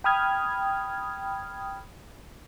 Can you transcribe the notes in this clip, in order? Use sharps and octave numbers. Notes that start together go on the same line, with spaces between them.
G5 B5 D#6 F6 G#6